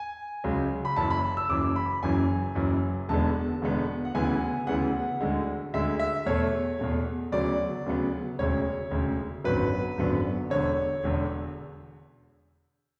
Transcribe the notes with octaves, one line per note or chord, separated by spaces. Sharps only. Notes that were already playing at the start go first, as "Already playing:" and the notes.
Already playing: G#5
C#2 C#3 F#3
B5
F#1 F#2 E3 A5
B5
E6
F#1 F#2 E3 D6
B5
F#1 F#2 E3 G#5
F#1 F#2 E3
E1 E2 D3 G#3 B3 A5
E1 E2 D3 G#3 B3
F#5
D2 C#3 E3 B3 G#5
D2 C#3 E3 B3 F#5
D2 D3 G#3
D2 D3 G#3 E5
E5
E2 B2 A3 C#5
E2 B2 A3
D2 C#3 F#3 B3 D5
D2 C#3 F#3 B3
E1 D2 C#3 C#5
E1 D2 C#3
G#1 F#2 D3 F#3 B3 B4
G#1 F#2 D3 F#3 B3
E1 E2 D3 C#5
E1 E2 D3